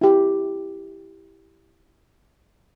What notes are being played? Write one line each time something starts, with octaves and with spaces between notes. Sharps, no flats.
E4 G4